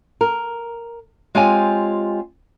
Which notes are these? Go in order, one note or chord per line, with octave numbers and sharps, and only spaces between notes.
A#4
G#3 C4 F4 G4 C#5 G#5